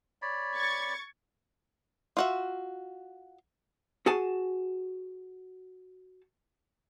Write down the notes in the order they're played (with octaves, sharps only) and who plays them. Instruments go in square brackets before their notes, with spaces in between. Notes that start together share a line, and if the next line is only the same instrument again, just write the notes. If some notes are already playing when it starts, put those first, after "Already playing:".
[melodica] C#5 D5 B5
[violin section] C#6 G#6 A6
[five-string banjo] F4 F#4 E5
[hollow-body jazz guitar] F#4 G#4 G#5 A5